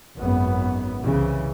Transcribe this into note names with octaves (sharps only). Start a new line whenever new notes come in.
G#1 F#2 B3
C2 C#3 E3